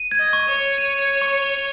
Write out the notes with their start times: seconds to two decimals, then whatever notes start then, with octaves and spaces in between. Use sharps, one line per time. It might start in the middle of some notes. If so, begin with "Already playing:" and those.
Already playing: D#7
0.11 G#6
0.19 D#5
0.33 C#6
0.48 C#5
0.55 C#6
0.78 D#7
0.99 G#6
1.22 C#6
1.44 C#6